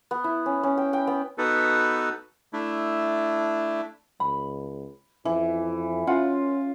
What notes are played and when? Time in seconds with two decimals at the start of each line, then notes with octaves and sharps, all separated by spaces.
0.11 B3
0.24 E4
0.46 C#4
0.63 C#4
0.77 G5
0.93 G5
1.07 B3
1.38 B3 D#4 F#4 A4 B4
2.53 A3 D4 E4
4.20 C#2 B5
5.25 F2 E3
6.07 C#4 F4 A#4 F#5 G#5